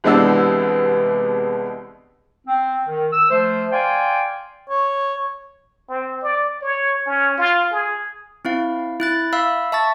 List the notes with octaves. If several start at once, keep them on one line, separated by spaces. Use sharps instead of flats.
C2 E3 G#3 B3 D4 E6
C4
D#3
E6
F3 A3 C5
D5 F5 G5 G#5 C6
C#5
C4
D5
C#5
C#4
F4
G#4
C4 E4 F5
E4 F#6 A6
E5 F5 B5 E6
E5 A5 C#6 A6